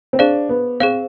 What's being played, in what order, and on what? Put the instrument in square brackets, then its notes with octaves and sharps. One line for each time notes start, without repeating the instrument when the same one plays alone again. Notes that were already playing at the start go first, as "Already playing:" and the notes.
[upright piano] C4
[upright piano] D4 [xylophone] G#4 C5 F5
[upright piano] B3
[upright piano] C4 [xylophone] G#4 C5 F5